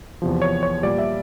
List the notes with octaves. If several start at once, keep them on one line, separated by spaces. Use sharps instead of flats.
E2 C3 F3
C#5
C#5
A#2 G3 D5
E5